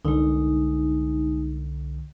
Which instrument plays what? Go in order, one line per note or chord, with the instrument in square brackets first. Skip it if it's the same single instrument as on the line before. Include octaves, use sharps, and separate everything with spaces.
[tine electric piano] C2 D3 [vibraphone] G#3 D#4